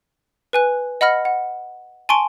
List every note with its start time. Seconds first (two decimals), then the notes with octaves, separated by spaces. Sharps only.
0.53 B4 G#5 F#6
1.01 D#5 F#5 B5 F6 A#6 C#7
1.25 F#5
2.09 G#5 A5 C6 C#6 D7